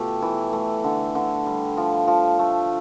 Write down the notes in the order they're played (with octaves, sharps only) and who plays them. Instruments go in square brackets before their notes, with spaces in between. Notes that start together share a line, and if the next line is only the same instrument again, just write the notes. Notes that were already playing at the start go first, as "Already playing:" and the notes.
Already playing: [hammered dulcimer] B2 A3 F4 G4
E3
A3
D3
D3
G3
F3
F3
A3